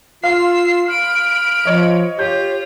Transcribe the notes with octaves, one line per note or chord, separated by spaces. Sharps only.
F4 F5 C6 E6 C7
B5 F6 D7
F3 C#5 D#5
F4 G4 C#5 G6